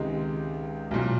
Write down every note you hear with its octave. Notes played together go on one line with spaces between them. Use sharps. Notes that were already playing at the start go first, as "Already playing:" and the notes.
Already playing: C#2 C3 D#3 G#3
B1 A#2 F#3